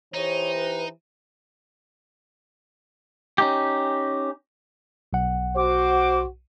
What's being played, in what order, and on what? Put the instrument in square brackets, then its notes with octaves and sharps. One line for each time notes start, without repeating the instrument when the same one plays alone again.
[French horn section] E3 G4 C5 [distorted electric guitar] D#4 [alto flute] C#5
[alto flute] B4
[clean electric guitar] C#4 D#4 G4
[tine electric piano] B1 F#5
[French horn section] F#4 C5 [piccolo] D6